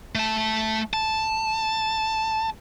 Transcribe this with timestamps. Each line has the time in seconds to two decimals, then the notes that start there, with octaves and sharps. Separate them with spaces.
0.15 A3 A5
0.93 A5